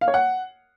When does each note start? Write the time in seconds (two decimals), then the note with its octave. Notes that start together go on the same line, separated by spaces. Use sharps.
0.01 F5
0.08 C#5
0.14 F#5